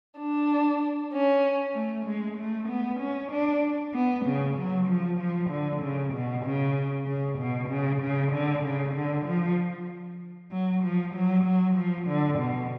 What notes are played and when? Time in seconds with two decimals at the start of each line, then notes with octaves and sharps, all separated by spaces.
0.19 D4
1.13 C#4
1.75 A3
2.06 G#3
2.38 A3
2.69 B3
3.00 C#4
3.31 D4
3.94 B3
4.26 C#3
4.57 F#3
4.88 F3
5.19 F3
5.51 D3
5.82 C#3
6.13 B2
6.45 C#3
7.07 C#3
7.39 B2
7.69 C#3
8.01 C#3
8.32 D3
8.64 C#3
8.95 D3
9.26 F3
10.52 F#3
10.82 F3
11.15 F#3
11.45 F#3
11.76 F3
12.08 D3
12.39 B2